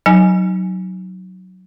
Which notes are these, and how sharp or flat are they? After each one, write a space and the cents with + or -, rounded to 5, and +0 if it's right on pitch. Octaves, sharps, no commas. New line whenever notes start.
F#3 +0 D#4 +0 G#5 +0